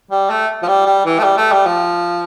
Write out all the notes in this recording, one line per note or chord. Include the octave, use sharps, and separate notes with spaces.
G3
A3
F3
G3
G3
E3
A3
G3
A3
G3
F3